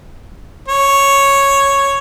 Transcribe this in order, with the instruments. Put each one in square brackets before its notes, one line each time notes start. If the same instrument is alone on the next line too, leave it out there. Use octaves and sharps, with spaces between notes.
[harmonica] C#5